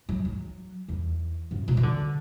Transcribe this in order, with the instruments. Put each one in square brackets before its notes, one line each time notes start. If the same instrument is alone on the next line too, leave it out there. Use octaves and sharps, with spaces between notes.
[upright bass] F#3
F#3
E2
F#2
B2
E3
D3